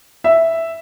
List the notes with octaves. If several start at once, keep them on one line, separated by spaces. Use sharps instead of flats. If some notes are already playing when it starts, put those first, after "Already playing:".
E5